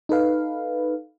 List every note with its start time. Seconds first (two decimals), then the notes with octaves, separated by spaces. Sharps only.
0.09 D#4 A4 B4 F5